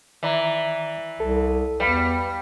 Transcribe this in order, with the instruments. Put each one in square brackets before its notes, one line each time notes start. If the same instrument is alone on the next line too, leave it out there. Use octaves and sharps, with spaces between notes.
[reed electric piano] D#3 D5 A#5 [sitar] E3
[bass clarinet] C2 [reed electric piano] A4
[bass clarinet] E2 [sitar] G3 [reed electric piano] B4 F5 B5